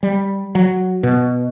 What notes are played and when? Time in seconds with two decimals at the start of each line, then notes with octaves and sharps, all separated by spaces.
0.03 G3
0.55 F#3
1.03 B2